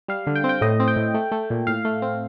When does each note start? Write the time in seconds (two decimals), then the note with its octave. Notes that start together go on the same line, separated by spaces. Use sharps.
0.08 G3 F5
0.27 D3
0.35 G5
0.44 C4
0.49 G5
0.61 A2 D#5
0.80 C4
0.88 G5
0.96 A2
1.14 A3
1.32 A3
1.50 A#2
1.67 A2 F5
1.85 A3
2.02 C4